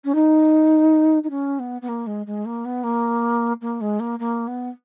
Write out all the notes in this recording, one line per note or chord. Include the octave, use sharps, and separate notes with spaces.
C#4
D#4
D#4
C#4
B3
B3
A#3
G#3
G#3
A#3
B3
A#3
A#3
G#3
A#3
A#3
B3